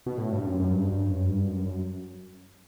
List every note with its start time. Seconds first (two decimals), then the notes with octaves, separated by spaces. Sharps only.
0.06 B2
0.18 A2
0.32 G2
0.46 F#2
0.59 F#2
0.73 G2
0.92 G2
1.10 F#2
1.29 G2
1.48 F#2
1.66 F#2